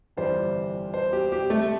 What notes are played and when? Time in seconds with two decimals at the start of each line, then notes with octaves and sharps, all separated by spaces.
0.17 G1 F2 E3 G3 C5
0.94 C5
1.13 G4
1.32 G4
1.50 A3